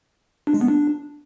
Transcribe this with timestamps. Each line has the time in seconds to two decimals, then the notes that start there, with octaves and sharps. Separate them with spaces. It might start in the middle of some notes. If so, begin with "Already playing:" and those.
0.47 D4
0.54 G#3
0.61 B3
0.68 D4